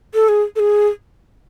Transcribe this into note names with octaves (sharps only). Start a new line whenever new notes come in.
A4
G#4
A4
G#4